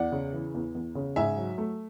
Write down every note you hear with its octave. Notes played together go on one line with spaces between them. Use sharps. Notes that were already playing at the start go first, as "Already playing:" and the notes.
Already playing: E2 D5 F#5
C#3
E3
E2
E2
C#3
G#2 E5 G#5
F#3
A3